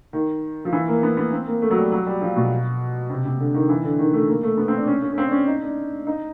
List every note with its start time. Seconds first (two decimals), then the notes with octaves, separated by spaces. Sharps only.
0.13 D#3
0.65 F3
0.73 E3
0.88 A#3
1.03 B3
1.17 B3
1.32 C4
1.47 A#3
1.62 A3
1.71 F#3
1.77 G3
1.92 F#3
2.07 G3
2.21 F3
2.36 B2
3.10 C3
3.25 C3
3.40 D3
3.54 D#3
3.69 E3
3.84 D3
3.99 D#3
4.13 A3
4.29 A#3
4.43 A3
4.58 B3
4.68 C4
4.78 D4
4.87 C#4
5.02 C#4
5.12 C#4
5.18 C4
5.28 D4
5.32 C#4
5.47 D#4
5.62 D4
6.07 D#4